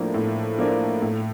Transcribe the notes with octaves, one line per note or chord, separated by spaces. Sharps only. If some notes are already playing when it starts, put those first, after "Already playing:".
Already playing: A2 F3 A#3 D4
A2
F3 A#3 D4
A2